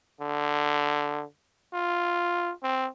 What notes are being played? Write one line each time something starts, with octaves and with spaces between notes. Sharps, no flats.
D3
F4
C4